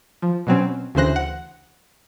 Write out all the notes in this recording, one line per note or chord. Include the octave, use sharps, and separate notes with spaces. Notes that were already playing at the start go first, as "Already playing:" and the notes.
F3
B2 F#3 C4 C#4
D2 C#3 E3 C5 F#6 A#6
F#5